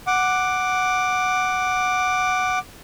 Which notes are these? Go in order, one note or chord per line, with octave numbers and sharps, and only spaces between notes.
F#5 D6